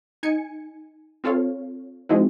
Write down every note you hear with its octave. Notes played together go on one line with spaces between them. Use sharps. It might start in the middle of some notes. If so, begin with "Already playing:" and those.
D#4 G#5 G#6 C#7
C4 F4 A4 C#5 F5
F3 G#3 C4 D#4 E4 F#4